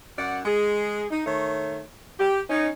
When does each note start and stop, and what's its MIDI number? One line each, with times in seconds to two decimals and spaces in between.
0.18 0.38 42
0.18 0.38 74
0.18 0.38 78
0.44 1.04 56
0.44 1.04 68
1.10 1.21 63
1.25 1.82 51
1.25 1.82 57
1.25 1.82 73
2.19 2.40 67
2.49 2.67 61
2.49 2.67 63